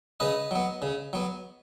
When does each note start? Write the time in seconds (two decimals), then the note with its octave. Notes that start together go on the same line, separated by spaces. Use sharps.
0.20 C#3 B4 D#5
0.51 F#3 B3
0.82 C#3
1.13 F#3 B3